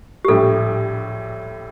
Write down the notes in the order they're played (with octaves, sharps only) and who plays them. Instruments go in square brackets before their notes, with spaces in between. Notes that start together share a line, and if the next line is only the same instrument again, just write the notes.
[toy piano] G4
[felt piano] A#1 A2 G3 [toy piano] A4